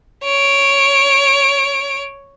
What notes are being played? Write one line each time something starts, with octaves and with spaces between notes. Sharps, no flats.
C#5 D7